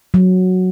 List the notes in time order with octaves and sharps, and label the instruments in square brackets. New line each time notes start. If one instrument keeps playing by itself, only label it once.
[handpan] F#3